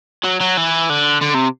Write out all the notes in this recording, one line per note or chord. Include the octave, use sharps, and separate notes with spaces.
F#3
F#3
E3
D3
D3
C3